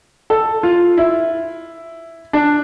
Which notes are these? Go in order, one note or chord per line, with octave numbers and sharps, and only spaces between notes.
A4
F4
E4
D4